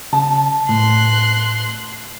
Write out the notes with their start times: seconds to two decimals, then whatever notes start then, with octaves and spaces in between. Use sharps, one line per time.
0.13 C#3 A5
0.69 A2 C6 F#6